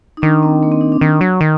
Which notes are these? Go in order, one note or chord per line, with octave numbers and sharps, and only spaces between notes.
D#4
D#3 D4
C4
A#3
C4
D#4
D4
D#3
F#3
D#3